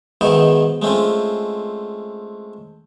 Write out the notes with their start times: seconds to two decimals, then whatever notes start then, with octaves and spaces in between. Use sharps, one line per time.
0.21 G#2 B2 D#3 D#4 E4
0.82 G#3 A3 C4 C#4 F4